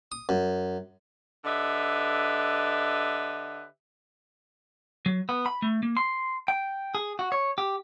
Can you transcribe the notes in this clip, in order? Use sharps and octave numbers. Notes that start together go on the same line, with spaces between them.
D#6
F#2
D3 G4 B4 D#5 E5
F#3
B3
B5
A3
A#3
C6
G5
G#4
F#4
C#5
G4